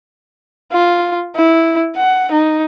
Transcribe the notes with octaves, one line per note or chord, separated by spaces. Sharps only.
F4
E4
F#5
D#4